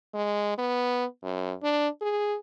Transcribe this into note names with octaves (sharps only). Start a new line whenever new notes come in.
G#3
B3
F#2
D4
G#4